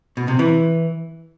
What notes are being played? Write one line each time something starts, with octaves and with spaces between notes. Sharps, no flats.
B2
C3
E3